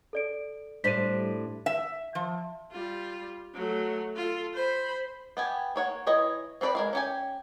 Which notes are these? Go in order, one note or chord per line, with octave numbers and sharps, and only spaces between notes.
A4 D5 D7
A2 G3 D4 C5 B6 D#7
E5
F3
G3 F4
F#3 A3
F4 A4
C5 B5
B3 G4 G#5
A#3 C#5 F#5
E3 E4 C#5 D#5
C4 F#4 B4 D5 B5
G#3 A#4 F5
C#4 G4 G#5